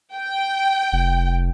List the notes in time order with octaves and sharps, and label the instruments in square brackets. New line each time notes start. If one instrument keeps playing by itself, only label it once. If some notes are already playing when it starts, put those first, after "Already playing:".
[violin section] G5
[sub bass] F1